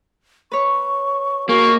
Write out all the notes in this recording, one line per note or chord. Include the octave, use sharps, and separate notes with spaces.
B4 C#5 C#6
A#3 F#4 G#4 D#5 C#6